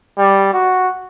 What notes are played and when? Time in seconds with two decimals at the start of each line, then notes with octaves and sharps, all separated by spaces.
0.18 G3
0.53 F#4